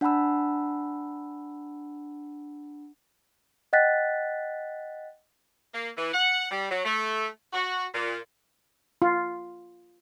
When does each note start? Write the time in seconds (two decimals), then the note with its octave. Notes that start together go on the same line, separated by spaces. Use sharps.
0.01 D4 F#5 A5 B5 E6
3.73 D#5 F#5 G5 F#6 A6 B6
5.73 A#3
5.97 E3
6.14 F#5
6.51 G3
6.70 F#3
6.85 A3
7.53 F#4
7.94 A#2
9.02 F4